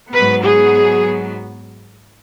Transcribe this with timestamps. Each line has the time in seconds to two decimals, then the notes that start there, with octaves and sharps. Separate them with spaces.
0.12 G#2 F#3 B3 B4
0.42 G#4